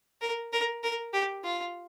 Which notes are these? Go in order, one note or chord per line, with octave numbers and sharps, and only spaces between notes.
A#4
A#4
A#4
G4
F4